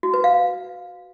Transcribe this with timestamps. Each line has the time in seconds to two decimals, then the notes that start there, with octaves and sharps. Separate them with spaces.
0.03 F#4
0.14 B4
0.24 F5